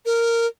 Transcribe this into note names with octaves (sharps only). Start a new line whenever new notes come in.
A#4